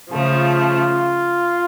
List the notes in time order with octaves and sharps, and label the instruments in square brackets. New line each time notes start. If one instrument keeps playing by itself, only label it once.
[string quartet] C#3 F3 A3 [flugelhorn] F4